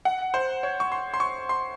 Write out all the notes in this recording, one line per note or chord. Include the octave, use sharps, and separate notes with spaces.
F#5
C5
C#5
C#6
C6
C6
C#6
C6